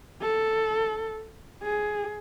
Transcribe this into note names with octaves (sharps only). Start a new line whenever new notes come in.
A4
G#4